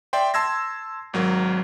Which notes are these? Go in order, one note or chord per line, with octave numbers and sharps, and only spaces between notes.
D5 E5 G5 C6
A5 C6 E6 G#6 A#6
G#1 F#3 A#4